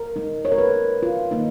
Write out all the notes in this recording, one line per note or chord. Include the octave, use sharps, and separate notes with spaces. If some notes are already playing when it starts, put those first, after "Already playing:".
Already playing: A#4
B2 G#3 D#4
C#5
A#4
B4
F4
D#3 A#3 D#4